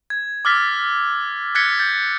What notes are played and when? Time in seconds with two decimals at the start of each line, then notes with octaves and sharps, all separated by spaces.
0.10 G#6
0.45 D6 E6 F6 A6 B6
1.55 F#6 G#6 A6 B6 C#7 G7
1.79 G6 A6